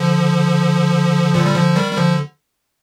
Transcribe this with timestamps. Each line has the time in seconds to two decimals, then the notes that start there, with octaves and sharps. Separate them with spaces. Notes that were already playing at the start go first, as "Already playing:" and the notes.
Already playing: D3 F3
1.34 A#2 D3
1.46 G3
1.55 D3 F3
1.76 D#3 G3
1.92 G3
1.97 D3 F3